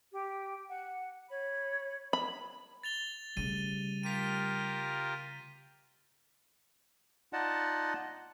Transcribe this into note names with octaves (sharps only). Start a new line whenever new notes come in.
G4 G5
F#5
C#5 B5
B5
A6 F7 G7
C#3 G3 A3 D#7
F4 G4 A#4 B6 D#7
D#4 F4 D5 D#5 F#5 A5